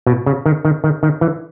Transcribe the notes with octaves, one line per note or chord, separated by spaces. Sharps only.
B2
C#3
D#3
D#3
D#3
D#3
E3